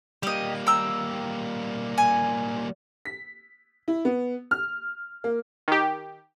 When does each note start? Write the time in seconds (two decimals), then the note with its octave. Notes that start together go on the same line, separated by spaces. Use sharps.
0.23 G3 A#3 G4 D#5
0.67 G5 A#5 E6
1.98 G#5
3.05 B6
3.88 E4
4.05 B3
4.51 F6
5.24 A#3
5.68 D#3 G4